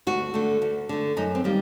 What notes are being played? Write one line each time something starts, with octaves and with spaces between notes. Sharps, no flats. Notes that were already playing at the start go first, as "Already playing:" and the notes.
D2 F#4
D3 A3
D2
D3 A3
F#2 D#4
C4
D#3 G3 A#3